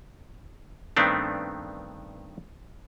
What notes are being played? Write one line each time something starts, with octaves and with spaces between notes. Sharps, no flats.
G2 D#3 A3 B3 C4 D4